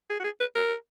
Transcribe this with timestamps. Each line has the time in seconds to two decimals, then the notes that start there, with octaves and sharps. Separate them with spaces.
0.10 G#4
0.20 F#4
0.24 G#4
0.40 B4
0.55 A#4